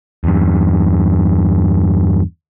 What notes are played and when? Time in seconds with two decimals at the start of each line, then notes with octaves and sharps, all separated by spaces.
0.24 E2 G2